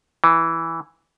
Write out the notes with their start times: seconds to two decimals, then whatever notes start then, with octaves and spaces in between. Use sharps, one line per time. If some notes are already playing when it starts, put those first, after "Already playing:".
0.24 E3